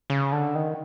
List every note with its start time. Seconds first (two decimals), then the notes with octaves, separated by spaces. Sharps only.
0.10 C#3
0.32 D3
0.55 D#3